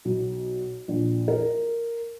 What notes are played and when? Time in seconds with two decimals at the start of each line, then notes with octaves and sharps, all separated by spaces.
0.05 B1
0.88 A#1
1.28 A#4